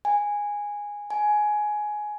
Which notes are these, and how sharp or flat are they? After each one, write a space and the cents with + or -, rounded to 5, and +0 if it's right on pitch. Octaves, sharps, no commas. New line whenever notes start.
G#5 -10
G#5 +15